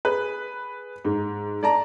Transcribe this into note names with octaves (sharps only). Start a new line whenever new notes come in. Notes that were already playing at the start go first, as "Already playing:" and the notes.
G#4 B4
G#2
D5 A5 A#5